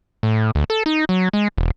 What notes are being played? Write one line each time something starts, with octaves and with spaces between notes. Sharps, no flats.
A2
D2
A4
D#4
F#3
G#3
E1